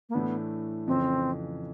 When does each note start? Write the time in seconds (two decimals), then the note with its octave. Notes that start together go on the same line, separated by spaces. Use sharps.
0.09 A#3
0.14 A2 E3 A3 B3 D4
0.87 F2 C#3 E3 C4